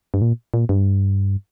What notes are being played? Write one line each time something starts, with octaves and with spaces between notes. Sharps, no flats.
G2
A#2
A#2
G2